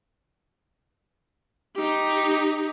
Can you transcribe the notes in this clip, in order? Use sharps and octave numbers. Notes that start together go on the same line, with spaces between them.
D#4 G4